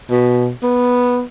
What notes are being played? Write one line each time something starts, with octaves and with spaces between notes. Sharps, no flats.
B2
B3